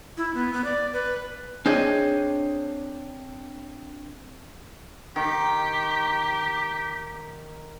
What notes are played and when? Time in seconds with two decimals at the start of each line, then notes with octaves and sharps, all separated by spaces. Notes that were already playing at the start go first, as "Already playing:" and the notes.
0.17 E4
0.34 B3
0.53 B3
0.64 D5
0.93 B4
1.66 C4 D4 G#4 C#5 D#5
5.16 D#3 G4